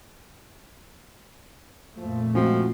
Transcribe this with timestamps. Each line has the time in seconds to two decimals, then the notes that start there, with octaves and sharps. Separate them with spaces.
1.98 F2 A#2 F3 A3
2.35 F3 G#3 C4 C#4 F#4